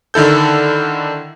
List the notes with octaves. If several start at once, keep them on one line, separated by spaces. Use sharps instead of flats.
D3 D#3 E4 A4 G6